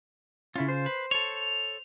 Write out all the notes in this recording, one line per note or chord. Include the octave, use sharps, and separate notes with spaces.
C#3 C#4 E4 F4
C5
B4
A4 C#5 F7